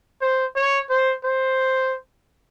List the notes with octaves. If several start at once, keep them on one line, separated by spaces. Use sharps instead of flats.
C5
C#5
C5
C5